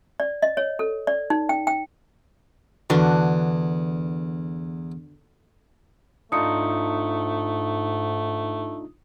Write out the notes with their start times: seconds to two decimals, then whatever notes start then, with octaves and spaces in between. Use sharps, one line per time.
0.20 D5
0.42 D#5
0.57 C#5
0.79 A4
1.07 D5
1.30 D#4
1.49 G5
1.67 G5
2.90 E2 D3 D4 F#4
6.32 G#2 A3 D4 D#4 F4 D#6 C#7